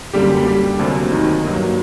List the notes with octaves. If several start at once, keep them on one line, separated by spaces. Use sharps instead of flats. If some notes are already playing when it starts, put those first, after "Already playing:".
F#2 D3 G3 A#3 G4
G3 G4
D2 C3 F#3 A#3 D4
D#3 D#4
G2 F#3 A#3